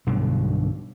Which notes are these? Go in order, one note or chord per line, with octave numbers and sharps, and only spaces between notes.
B1 G2 B2 D3